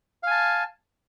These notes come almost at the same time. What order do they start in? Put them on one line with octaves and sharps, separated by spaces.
F5 G#5 A5